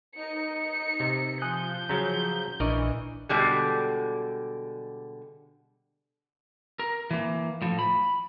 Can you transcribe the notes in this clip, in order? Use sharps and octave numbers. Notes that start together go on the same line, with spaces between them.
D#4 C#7
C3
F3 G#5 D#6 F#6 G6
C#3 F#3 C#4 A#5
A#1 E3 D4 A#4 D5 D#5 C#6
B2 D3 G3 G#3
A#4
E3 A#3
A2 F3
B5